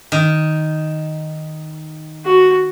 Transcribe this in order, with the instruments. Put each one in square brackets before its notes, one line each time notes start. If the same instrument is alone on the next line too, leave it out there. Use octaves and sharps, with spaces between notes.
[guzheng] D#3
[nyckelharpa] F#4